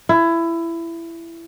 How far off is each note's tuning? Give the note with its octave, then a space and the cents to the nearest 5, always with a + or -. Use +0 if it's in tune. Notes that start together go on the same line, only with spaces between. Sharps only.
E4 +20